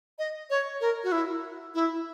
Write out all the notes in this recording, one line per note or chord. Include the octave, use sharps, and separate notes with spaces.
D#5
C#5
A#4
F#4
E4
E4